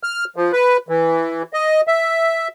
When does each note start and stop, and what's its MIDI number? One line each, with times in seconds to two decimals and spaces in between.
0.03 0.24 89
0.36 0.52 53
0.52 0.77 71
0.89 1.43 52
1.53 1.81 75
1.88 2.48 76